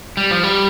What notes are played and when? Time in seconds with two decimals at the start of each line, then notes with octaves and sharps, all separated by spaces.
0.17 G3
0.31 F3
0.44 G3